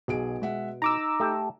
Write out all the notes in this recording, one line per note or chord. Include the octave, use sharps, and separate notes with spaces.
B1 B2 G#4 D7
G#3 E5 F#5
D#4 A#5 D6 E6
A3 G4 A4